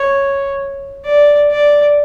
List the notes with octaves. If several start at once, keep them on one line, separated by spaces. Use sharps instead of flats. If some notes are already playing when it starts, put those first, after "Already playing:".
Already playing: C#5
D5
D5